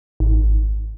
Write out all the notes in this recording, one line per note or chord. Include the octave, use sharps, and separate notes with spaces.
G#1